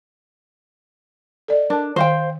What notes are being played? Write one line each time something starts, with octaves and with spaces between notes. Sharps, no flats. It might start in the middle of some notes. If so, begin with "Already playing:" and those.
A4 D5 D#5
D4 A#4 A5
D#3 C5 F5 G5